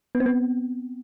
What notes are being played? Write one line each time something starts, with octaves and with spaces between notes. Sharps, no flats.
B3
C4
B3